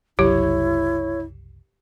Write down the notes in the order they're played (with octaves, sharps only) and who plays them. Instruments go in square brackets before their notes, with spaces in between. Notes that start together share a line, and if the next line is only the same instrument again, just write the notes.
[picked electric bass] F#1 C2 F#3 [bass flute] E4 [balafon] G4 [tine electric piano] C#5